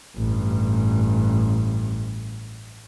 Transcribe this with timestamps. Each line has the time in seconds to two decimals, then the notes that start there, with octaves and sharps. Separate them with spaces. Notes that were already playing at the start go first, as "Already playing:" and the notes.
0.17 A1 G2